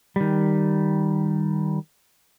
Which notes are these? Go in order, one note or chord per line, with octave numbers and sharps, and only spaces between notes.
D#3 G3